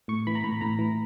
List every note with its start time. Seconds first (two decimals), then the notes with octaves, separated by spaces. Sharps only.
0.08 A2 C#6
0.27 E3 B5
0.35 A#5
0.44 A2 B5
0.61 A2 A#5
0.79 E3